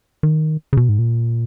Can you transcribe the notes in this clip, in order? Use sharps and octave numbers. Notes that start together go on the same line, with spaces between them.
D#3
C#3
B2
G#2
A#2